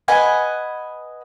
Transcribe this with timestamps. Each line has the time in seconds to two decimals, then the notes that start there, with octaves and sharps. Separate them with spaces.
0.08 B4 D#5 F#5 G#5